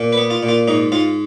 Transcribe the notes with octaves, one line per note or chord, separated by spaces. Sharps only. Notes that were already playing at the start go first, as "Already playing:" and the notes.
Already playing: A#2
B4
B3
F4
A#2
F4
G#2 D#4
G#2 F4